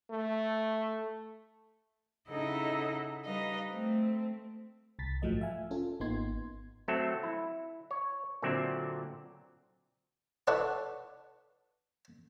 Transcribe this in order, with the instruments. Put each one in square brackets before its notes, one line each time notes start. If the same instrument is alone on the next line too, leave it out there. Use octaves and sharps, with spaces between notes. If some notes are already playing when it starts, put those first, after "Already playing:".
[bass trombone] A3
[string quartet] C#3 D#4 E4 A4 D#5 F#5
G3 D#4 B4 D#5 F5
A3 C4
[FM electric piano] C2 A6 B6
A#1 G#2 F3 F#3 A3 D#5
E5 F5 G#5
C#4 F4 A4
G#1 A#3 B3 D#4 C6 G#6
[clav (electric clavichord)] F#3 A3 C4 A4 E5
E4
C#5
A#2 D3 F#3 C4 D5 E5
[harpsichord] E4 A4 B4 C#5 D5 F#5